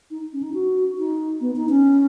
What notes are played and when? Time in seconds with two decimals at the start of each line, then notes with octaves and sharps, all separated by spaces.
0.11 D#4
0.33 C#4
0.43 D#4
0.54 F#4
0.98 D#4
1.41 B3
1.56 D#4
1.69 C#4